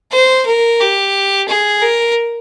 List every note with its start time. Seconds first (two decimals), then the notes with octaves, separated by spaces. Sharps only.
0.12 C5
0.46 A#4
0.80 G4
1.49 G#4
1.82 A#4